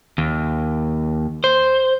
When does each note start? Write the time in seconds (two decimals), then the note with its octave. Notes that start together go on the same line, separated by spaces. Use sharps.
0.18 D#2
1.44 C5